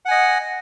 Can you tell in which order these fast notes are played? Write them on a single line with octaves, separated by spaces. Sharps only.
F#5 G#5 D#5